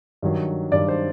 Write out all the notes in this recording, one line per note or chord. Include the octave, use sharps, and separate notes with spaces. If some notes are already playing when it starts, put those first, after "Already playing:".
G2 D#3 F#3
G2 D#3 F#3 D5
C5